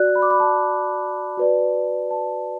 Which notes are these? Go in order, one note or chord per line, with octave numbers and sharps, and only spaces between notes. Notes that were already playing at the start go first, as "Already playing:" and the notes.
Already playing: F#4 D5 F#6
B5
D6
B5
A5
F#4 B4 D5
A5